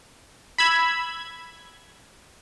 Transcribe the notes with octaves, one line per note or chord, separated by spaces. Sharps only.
B5 E6 G#6